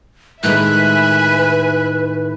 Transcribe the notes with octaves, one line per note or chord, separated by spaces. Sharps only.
A2 D#3 G#3 B4 E5 G#5 B5 F#6